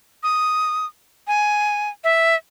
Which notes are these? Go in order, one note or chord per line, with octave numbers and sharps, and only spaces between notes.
D#6
G#5
E5